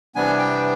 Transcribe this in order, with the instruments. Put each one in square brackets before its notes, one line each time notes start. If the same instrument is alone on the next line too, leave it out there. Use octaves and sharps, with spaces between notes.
[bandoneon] C3 E3 G3 B3 D4 G#5
G5